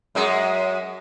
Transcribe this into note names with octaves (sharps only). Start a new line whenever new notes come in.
F#2 G#3